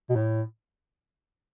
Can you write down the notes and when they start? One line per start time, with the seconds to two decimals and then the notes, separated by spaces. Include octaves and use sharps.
0.10 B2
0.15 A2